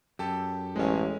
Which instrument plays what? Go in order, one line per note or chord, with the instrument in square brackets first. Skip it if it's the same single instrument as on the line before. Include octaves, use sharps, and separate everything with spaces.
[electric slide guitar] F#2 [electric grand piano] G4 A4 A5
[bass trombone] A1 [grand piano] G#3 C#4